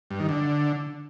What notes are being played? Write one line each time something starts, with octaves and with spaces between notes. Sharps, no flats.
G2
D#3
D3